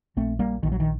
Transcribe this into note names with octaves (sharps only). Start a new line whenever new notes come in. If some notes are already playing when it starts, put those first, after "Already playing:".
A#1 A3 C4
G3 A#3
A#1 D#3
F#3
D#3